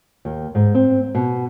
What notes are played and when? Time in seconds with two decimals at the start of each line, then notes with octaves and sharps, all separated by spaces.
0.25 D#2
0.55 G#2
0.75 C4
1.15 B2